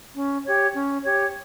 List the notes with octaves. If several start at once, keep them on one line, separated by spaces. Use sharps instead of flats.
C#4
G4 C#5
C#4
G4 C#5